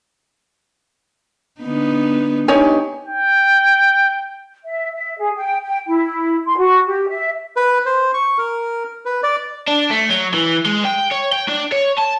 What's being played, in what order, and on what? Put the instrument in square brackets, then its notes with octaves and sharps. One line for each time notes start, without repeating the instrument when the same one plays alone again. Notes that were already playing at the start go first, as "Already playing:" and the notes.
[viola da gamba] D3 B3 D#4
[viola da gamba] B3 D4 G4 [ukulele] D#4 C#5 G#5
[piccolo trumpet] G5
[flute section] E5
E5
G#4
G5
G5
E4
C6
F#4
G4
E5
[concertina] B4
C5
C#6
A#4
B4
D5
[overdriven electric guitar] D4
A3
F#3
E3
G#3
G5
C#5
G5
D4
C#5
A5